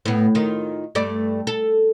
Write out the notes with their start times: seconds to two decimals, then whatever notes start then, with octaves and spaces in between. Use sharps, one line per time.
0.06 A2 B3
0.35 D#3 F4
0.95 G2 A3 D5
1.47 A4